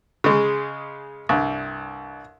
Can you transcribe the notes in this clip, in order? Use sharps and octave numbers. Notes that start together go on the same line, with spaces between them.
C#3 G#3
C2 G2